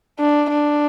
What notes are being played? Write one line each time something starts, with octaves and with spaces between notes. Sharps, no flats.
D4
D4